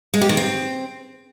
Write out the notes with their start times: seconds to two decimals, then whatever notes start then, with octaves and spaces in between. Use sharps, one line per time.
0.14 G#3
0.21 G4
0.29 D#3
0.37 C4